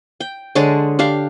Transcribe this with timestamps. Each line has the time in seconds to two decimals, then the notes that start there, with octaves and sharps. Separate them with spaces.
0.20 G5
0.55 D3 G#3 C#5 A5
0.99 D4 G4 F5